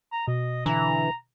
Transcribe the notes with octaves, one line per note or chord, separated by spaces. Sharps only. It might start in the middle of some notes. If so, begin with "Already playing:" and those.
A#5
B2 D#5
D3 E3 E4 A#5